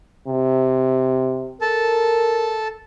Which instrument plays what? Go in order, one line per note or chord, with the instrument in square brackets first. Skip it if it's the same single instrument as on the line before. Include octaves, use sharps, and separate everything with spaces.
[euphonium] C3
[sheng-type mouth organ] A4 A5 [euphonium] A#4